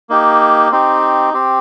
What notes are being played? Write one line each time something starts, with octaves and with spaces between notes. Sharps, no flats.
A#3 D#4 G4
C4 D#4 G4
C4 G4